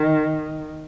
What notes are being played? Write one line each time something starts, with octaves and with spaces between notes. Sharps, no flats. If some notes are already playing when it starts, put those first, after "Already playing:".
Already playing: D#3